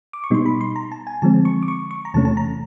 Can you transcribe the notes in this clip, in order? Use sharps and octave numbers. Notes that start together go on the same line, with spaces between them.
D6
C#6
B2 G3 B3 D#4 C6
B5
C6
A#5
A5
G#5
D3 F3 G#3 C4 A5
C#6
D6
C#6
C#6
A#5
E2 C3 E3 A3 C#4 A5
A5
A#5